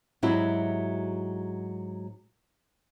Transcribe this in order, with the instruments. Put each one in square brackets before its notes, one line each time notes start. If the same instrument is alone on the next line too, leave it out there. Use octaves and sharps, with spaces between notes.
[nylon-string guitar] G#2 F#3 C4 E4 F#4 G4